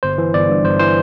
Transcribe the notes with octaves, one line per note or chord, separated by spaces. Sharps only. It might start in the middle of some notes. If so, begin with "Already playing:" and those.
G1 C5
E3
G1 D5
G2
G1 C5
E3 C5